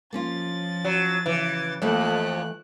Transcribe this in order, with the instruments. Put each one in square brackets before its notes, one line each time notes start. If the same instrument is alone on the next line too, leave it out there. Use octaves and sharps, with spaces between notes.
[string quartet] F3 A6 [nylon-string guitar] A#3 C#4 F4
[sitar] F#3
[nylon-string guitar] C#3 [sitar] E3
[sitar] F2 [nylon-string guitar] E3 A3 A#3 [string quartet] F#6